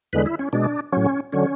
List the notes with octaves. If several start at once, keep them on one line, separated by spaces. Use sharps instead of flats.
E2 D3 G#3 B4
E4
C#4
B2 G#3 D4
A2 F#3 C#4
D3 F#3 C#4